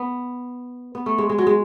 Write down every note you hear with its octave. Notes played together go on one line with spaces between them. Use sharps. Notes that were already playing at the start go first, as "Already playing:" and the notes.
Already playing: B3
B3
A3
G#3
G#3
F#3
G#3